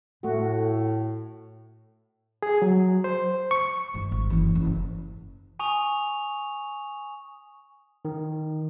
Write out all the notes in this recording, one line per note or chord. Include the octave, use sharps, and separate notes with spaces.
A2 A3 F#4
G#4
F#3
C5
C#6
G2 D#3
G#1
F#1 E3
F#1
G#5 C#6 D#6 F7
D#3